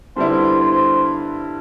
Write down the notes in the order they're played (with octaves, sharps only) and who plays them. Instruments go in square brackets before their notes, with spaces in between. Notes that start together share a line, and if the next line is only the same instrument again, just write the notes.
[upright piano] G2 D3 G3 B3 E4 [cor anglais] C5
[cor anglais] C5